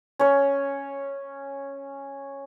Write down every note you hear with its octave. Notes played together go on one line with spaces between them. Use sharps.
C#4 C#5